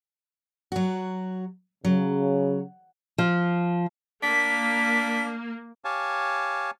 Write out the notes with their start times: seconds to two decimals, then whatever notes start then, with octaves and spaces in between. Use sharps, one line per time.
0.72 F#3 F#4
1.85 C#3 F#3
3.18 F3
4.23 A#3 D4 B6
5.85 G4 C#5 F5 G#5 A5